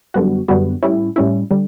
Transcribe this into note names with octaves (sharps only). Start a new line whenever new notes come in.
F#2 D3 G3 B3 F#4
F#2 D3 G3 B3 F#4
A2 G3 C#4 E4
A2 G3 C#4 E4
D3 G3